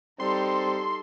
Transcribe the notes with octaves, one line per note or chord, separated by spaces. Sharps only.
G3 C4 D#4 A4 C6